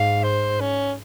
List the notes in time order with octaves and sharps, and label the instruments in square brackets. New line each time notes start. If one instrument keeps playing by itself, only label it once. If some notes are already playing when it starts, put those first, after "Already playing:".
Already playing: [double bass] G#2 [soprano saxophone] F5
[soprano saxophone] C5
C#4